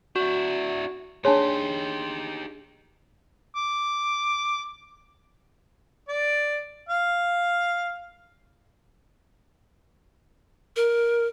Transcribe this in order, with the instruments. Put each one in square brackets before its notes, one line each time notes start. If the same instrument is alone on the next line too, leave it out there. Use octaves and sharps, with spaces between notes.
[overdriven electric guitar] D4 E4 [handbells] F#4
[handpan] D4 G#4 [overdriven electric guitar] D#4 G4 [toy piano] C#5 G#5 A5 [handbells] C6
[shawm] D6
[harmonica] D5
F5
[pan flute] A#4